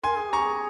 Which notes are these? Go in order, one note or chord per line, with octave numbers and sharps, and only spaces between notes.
A#4 G#5 C6
G#4
G4 A#5 C#6
G#4